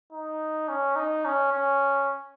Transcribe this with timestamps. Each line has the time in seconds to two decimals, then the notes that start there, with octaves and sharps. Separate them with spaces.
0.13 D#4
0.69 C#4
0.96 D#4
1.25 C#4
1.53 C#4